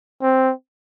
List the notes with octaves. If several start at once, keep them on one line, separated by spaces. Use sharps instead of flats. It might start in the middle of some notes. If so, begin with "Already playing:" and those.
C4